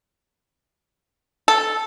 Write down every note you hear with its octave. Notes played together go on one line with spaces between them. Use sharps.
A4